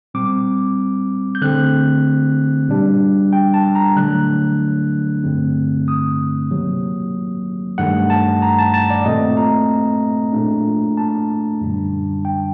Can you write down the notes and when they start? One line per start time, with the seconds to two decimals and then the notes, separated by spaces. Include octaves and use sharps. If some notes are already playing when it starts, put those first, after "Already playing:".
0.14 A#2 G3 C4 D6
1.35 G6
1.42 D3 A3 C4 F#6
2.68 A#2 G3 D4
3.33 G5
3.54 A5
3.75 A#5
3.96 D3 F#3 A3 D4 F#6
5.24 G2 D3 A3 C4
5.88 D#6
6.51 C3 D#3 F#3 A#3
7.78 G2 D#3 A3 F#5
8.10 A5
8.42 A#5
8.58 A5
8.74 A5
8.90 D5
9.05 A#2 A3 C4 D#5
9.37 A#5
10.33 A#2 A3 D4
10.97 A5
11.61 F#2 D3 G3 D4
12.25 G5